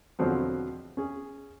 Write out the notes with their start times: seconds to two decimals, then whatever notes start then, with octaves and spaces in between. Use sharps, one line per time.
0.19 E2 B2 D3 F3 F#3 C4
0.97 C#4 G#4